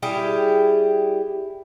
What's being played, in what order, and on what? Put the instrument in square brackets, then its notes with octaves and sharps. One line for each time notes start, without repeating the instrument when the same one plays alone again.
[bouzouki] G3 E4 G4 G#4